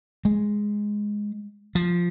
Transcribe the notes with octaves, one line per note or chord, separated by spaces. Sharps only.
G#3
F3